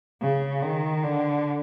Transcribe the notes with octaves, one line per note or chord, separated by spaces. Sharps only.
C#3
D#3
D3